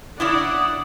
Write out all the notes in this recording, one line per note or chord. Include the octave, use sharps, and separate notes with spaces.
C#3 D4 E4 D5 F#5 D#6